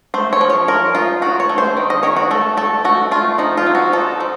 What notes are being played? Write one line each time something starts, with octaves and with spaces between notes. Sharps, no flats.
A3 C5
C#5
F3
C#5
F3 A#4
D#4 F4
D#3 F#4
C#5
A3
C5
D#3
D#5
D#3 C#5
F#4
A3 A4
A3 A4
A3 F#4
A3 F4
F3 D#4
F4
C4
F#4
D#4 A4
F3